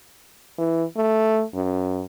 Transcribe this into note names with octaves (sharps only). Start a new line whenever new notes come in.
E3
A3
F#2